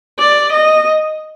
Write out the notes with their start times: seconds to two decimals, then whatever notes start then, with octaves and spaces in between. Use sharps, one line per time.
0.19 D5
0.52 D#5